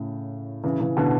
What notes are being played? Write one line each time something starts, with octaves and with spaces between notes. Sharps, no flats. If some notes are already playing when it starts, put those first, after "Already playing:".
Already playing: A2 C#3
C#3 E3
C#3 E3
B2 D3